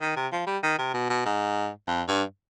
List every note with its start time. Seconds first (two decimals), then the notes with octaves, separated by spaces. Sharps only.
0.01 D#3
0.16 C3
0.32 F3
0.47 G3
0.63 D#3
0.78 C3
0.94 B2
1.10 B2
1.26 G#2
1.88 F2
2.08 G2